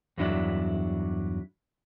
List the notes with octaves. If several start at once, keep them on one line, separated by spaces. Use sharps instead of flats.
E2 G2 F#3 D4 E4 D5